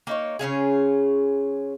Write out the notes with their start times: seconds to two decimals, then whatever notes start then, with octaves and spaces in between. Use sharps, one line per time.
0.07 A#3 D#4 C#5
0.39 C#3 C#4 F4 G#4